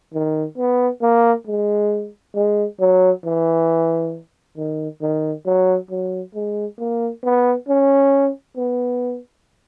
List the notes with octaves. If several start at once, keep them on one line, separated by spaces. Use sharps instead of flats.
D#3
B3
A#3
G#3
G#3
F#3
E3
D#3
D#3
F#3
F#3
G#3
A#3
B3
C#4
B3